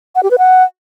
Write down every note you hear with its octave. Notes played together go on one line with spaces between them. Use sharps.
F#5
G4
B4
F#5